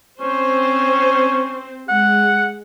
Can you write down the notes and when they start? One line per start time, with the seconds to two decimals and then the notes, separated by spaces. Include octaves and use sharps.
0.21 C4 C#4 C5
1.89 G#3 F#5